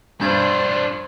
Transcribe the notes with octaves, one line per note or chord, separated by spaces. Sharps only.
G2 D4 F4 C5 G6 G#6 F#7